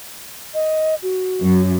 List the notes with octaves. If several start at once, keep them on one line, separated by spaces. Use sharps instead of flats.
D#5
F#4
F#2